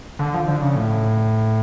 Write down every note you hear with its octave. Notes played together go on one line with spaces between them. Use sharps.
D3
F3
D3
C#3
A2